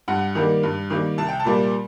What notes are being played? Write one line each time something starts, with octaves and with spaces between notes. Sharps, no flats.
G2 F#5
D#3 G3 A#3
G2
D#3 G3 A#3
C2 A5
G5
A5
A#2 G3 A#3